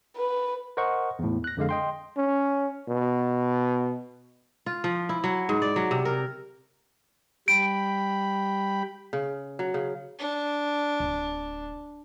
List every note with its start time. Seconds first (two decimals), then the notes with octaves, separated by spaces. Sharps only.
0.16 B4
0.77 A#4 C5 D#5 F#5 C#6
1.19 E2 A2
1.44 F#6 A#6
1.57 F2 D3 G#3 F5
1.69 D#5 G5 C6
2.17 C#4
2.88 B2
4.66 F4
4.84 F3
5.09 E4
5.24 F#3
5.49 G#2
5.62 D5
5.76 F#3
5.91 C3
6.05 A#4
7.48 G3 G5 B5 D7
9.13 C#3
9.59 F#3
9.74 C#3
10.19 D4
11.00 D1